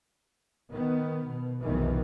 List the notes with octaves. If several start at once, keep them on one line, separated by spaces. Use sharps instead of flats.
D#3 B3
B2
F1 B1 E2 B2 D#3 E3